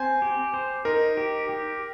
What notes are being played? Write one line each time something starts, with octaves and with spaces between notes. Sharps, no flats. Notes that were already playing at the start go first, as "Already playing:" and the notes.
Already playing: C4 C5 G#5
G4
C5
D#4 A#4
G4
G4